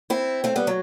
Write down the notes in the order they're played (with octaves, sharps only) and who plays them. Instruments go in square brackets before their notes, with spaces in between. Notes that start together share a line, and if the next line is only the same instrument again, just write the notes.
[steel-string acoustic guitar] C4 E4
A3 C4
G3 B3
F#3